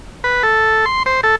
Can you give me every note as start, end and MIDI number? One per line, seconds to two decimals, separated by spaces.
0.24 0.43 71
0.43 0.85 69
0.86 1.03 84
1.06 1.21 72
1.23 1.36 69